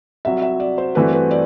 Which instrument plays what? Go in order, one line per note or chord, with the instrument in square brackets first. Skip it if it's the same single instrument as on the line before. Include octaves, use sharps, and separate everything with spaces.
[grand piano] C2 C3 F#3 [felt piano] E5
[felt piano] E5
D5
C5
[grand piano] G2 E3 A3 C4 F#4 [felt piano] B4
[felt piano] B4
D5